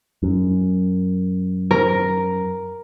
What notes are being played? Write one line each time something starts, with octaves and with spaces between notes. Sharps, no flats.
F#2
A#4